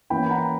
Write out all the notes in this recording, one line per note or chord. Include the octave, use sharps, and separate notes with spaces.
E3 A#3 C#4 G5 B5
B5
F#5 A#5